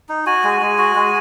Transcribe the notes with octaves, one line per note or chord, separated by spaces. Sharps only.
D#4
F#4 G#5
G#3
G#3
F#4
G#3